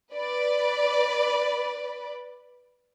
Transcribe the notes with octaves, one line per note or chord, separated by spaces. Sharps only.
B4 D5 B5